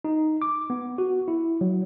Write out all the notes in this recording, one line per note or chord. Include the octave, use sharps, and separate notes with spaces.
D#4
D6
B3
F#4
E4
F#3